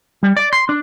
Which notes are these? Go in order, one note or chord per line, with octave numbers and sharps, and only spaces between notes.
G3
D5
C6
D4